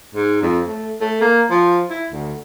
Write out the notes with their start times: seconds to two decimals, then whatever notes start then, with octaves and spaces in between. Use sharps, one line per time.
0.15 G#2
0.42 F2
0.67 A3
1.01 A3
1.21 A#3
1.50 F3
1.90 E4
2.12 D2